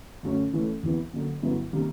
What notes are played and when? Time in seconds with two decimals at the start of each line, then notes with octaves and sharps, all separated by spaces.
0.23 F#2 D3 F#3 A3 C#4
0.53 E3 A3 C#4
0.83 E2 C3 E3
1.13 D3 F#3 A#3
1.42 G2 D3 F#3 B3 E4
1.73 C3 D#3 G3 A#3